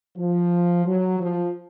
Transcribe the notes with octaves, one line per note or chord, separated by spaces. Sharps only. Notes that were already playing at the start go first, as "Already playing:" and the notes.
F3
F#3
F3